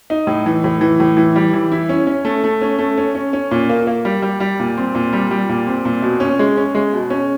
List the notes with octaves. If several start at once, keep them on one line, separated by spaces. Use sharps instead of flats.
D#4
A2
E3
A2
E3
A2
E3
G3
E3
E4
C#4
C#4
A3
A3
C#4
A3
C#4
C#4
C#4
A#2
A#3
A#3
G3
G3
G3
A#2
C4
A#2
G3
G3
A#2
C4
A#2
B2
C#4
G#3
C#4
G#3
B2
C#4